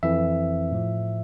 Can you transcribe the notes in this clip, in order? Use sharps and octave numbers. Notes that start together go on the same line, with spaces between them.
F2 E3 E5
A2 F3